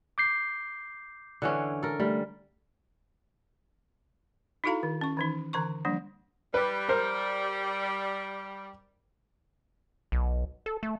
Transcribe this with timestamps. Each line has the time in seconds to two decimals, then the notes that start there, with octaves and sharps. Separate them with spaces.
0.18 D6 G6 C7
1.42 D3 E3 C#4
1.83 A4 A#4
2.00 G3 A3
4.64 D#4 E4 F#4 A4 F5 A#5
4.83 D#3
5.01 C#4 C#6
5.17 D#3 E3 D#4
5.53 D3 E3 A#5 C#6
5.85 F3 G3 A#3 D4
6.54 G3 B4
6.89 A#4 C5
10.12 B1
10.66 A4
10.83 A3